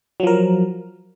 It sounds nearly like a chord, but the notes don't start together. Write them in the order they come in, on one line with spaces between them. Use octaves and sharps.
F#3 F3 A#4